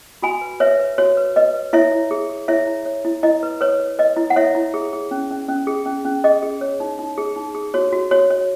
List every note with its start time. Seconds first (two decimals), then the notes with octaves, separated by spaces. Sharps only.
0.22 F#4 G#5 B5
0.41 B4
0.60 B4 C#5 E5
0.80 B4
0.98 F#4 C#5
1.17 B4
1.36 B4 D#5
1.54 B4
1.73 E4 C#5 E5
1.92 E4
2.11 G#4
2.30 G#4
2.48 E4 C#5 E5
2.67 E4
2.86 C#5
3.05 E4
3.23 E4 D#5
3.43 B4
3.61 B4 C#5
3.80 B4
3.99 B4 D#5
4.17 E4
4.30 F#5
4.36 E4 C#5 E5
4.55 E4
4.74 G#4
4.93 G#4
5.11 C#4
5.31 C#4
5.49 C#4
5.67 G#4
5.86 C#4
6.05 C#4
6.24 G#4 D#5
6.43 G#4
6.61 C#5
6.80 D#4
6.99 D#4
7.18 G#4
7.36 D#4
7.55 G#4
7.74 F#4 C#5
7.92 F#4
8.11 F#4 C#5
8.30 C#5